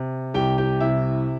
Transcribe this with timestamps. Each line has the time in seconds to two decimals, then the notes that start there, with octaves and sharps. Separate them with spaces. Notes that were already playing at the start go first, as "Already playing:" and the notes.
Already playing: C3
0.34 C2 G4 G5
0.58 G4 G5
0.80 C3 E4 E5